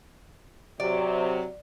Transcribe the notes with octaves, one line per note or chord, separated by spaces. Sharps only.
C3 F#3 D5